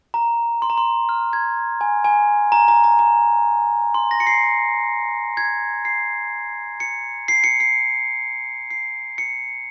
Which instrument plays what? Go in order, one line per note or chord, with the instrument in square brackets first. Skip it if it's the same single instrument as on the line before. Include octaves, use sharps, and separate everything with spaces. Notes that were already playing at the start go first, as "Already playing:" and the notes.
[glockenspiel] A#5
C6
A#5
C6
F6
G#6
G#5
G#5
A#5
A#5
A#5
A#5
C6
A#6
C#7
C7
G#6
C7
C#7
C7
C#7
C7
C7
C#7